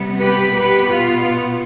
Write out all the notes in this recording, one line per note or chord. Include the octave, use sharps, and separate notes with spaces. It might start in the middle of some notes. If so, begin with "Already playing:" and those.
Already playing: C3 G3 B3
G4 B4
B2 B3 G4 B4
F4